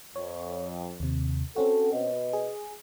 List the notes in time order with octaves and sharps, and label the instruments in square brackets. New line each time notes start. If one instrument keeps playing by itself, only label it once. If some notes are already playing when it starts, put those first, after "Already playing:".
[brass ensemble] F2 [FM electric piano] C#5
[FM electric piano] D#2 C3
[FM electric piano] C4 C#4 F#4 [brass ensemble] A4
[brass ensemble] B2 B4 D#5
[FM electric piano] G#4